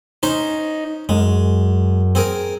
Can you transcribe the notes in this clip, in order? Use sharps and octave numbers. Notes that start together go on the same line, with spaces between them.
C#4 D#4 C5 C6
F#2 G#3
C4 G#4 A#4